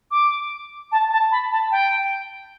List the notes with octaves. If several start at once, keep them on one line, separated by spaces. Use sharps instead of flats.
D6
A5
A5
B5
A5
G5